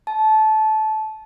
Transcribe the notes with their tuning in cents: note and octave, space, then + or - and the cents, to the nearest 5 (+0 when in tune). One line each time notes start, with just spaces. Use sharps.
A5 -20